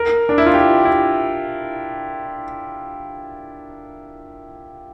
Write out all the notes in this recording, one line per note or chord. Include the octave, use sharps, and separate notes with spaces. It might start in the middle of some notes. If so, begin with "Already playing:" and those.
Already playing: A#4
D4
E4
F4
G4
E4